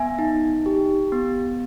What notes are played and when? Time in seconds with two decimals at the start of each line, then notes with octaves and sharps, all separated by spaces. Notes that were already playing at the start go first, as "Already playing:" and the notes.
Already playing: B3 E5 G#5
0.19 D#4
0.66 G4
1.12 B3